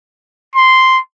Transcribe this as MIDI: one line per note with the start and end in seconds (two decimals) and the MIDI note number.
0.56 0.98 84